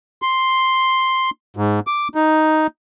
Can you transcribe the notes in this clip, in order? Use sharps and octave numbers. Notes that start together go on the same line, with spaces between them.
C6
G#2
D6
D#4